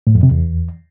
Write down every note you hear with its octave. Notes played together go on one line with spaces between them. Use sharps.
A2
F2
C3
E2